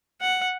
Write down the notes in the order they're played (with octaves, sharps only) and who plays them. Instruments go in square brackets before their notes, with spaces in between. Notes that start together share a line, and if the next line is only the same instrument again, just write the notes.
[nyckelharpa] F#5